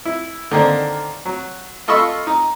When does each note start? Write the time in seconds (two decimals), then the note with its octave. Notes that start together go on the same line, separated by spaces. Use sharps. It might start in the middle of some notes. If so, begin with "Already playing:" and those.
0.05 E4
0.52 D3 D#3 A#3 C4 D4
1.25 F#3
1.88 F4 A4 D#5 B5 C#6 E6
2.27 D#4